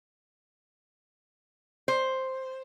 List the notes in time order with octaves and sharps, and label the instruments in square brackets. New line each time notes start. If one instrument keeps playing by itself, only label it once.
[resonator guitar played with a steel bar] C5